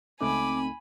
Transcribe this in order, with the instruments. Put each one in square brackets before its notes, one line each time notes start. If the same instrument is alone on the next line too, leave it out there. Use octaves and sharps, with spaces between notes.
[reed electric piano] C#2 A3 D#4 [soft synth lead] C4 [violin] G#5 B5 [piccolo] D6